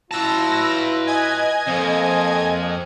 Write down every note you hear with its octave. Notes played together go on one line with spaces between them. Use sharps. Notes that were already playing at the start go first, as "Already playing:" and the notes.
F#3 E4 F4 B4 A5 E6 A#6
D#5 G#5 G#6
F2 A#3 A4 C5